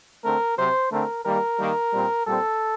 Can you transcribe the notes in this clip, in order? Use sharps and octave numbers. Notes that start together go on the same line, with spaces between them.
D3 A3 C4 A#4
C3 F#3 C4 C5
D3 A3 C4 A#4
D#3 G3 A#3 A#4
D#3 G3 A#3
A#2 G3 C4
A#2 G3 C4 A4